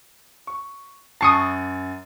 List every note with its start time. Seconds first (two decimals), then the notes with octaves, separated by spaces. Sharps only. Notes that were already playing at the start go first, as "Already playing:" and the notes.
0.47 C#6
1.21 F#2 A5 C#6 D#6 C7